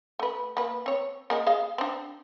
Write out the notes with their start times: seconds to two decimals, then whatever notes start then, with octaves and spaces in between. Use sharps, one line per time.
0.19 A3 B4
0.57 A#3 B4
0.86 C4 C#5
1.30 A#3 G#4 D#5
1.47 G#4 D#5 F5
1.78 C4 D4